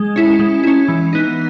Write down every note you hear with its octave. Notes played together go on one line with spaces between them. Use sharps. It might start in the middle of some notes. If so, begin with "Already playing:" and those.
Already playing: G#3
C#4 E4
G#3
C#4 E4
E3
B3 D#4